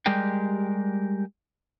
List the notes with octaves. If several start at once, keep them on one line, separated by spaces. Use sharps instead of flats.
G3 G#3 G4 A#4 G5